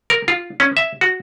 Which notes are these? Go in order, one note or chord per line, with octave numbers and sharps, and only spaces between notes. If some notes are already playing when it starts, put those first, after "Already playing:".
A#4
F4
C#4
E5
F#4